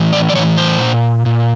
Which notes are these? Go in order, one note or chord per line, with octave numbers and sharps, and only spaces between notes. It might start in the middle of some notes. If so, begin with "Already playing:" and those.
Already playing: A2 E3
D5
D5
A2 E3 C#5
C5
A#2
A#2